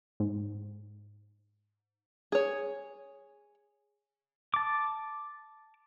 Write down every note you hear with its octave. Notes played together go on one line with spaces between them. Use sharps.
G#2
G#4 C#5
A5 D6